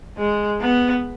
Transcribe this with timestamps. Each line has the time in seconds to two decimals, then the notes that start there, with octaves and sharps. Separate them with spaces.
0.18 G#3
0.60 B3